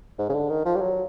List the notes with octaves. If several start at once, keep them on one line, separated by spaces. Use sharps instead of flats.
G#2
C#3
D3
D#3
F3
G3
F#3